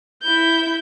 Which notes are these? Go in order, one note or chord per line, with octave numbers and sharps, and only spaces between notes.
E4 G6